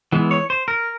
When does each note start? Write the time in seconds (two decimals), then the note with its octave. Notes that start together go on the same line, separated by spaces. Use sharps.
0.12 E3 G#3 B3
0.31 C#5
0.50 C5
0.68 A#4